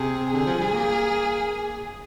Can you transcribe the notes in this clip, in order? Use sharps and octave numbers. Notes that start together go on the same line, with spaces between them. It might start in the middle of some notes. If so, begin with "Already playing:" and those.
Already playing: C3 G#4
D3 G#4
F3
G3
A#3